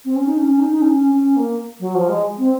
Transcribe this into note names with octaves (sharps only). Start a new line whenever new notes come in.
C4
C#4
D#4
C#4
C#4
D#4
D#4
C#4
C#4
C#4
A#3
F#3
F3
G#3
C4